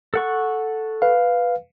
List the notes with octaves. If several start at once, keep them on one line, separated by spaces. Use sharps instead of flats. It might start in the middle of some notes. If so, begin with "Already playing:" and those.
A4 F#5 C#6
B4 F5